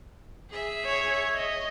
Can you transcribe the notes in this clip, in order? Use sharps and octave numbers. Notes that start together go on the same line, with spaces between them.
G#4 E5
C#5
D#5